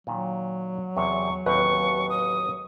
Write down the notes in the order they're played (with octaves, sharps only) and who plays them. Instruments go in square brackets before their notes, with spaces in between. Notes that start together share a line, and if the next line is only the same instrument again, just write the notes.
[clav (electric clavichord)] A#2 D#3 [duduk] F#3
[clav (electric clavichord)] E2 C3 [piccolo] C#6
[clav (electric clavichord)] A1 D#2 C4 [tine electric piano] B4 [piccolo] C#6
[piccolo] D#6